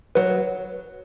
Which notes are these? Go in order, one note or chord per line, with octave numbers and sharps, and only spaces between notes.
F#3 B4